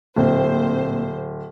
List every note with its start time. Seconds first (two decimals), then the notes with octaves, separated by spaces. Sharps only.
0.16 D1 A#2 C4 C5